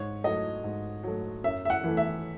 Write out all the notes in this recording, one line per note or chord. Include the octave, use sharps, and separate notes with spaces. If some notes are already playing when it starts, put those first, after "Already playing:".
Already playing: G#2 C#5
F#3 A3 D#5
G#2
F#3 A3
F#2 E5
E5
F#5
E3 A3
E5